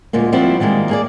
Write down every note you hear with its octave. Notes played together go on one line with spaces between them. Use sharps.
D2 A#2 G#3 A#3
F3 G3 C4 E4 F#4
D#3 G3 G#3 A#3
A#3 G#4 D5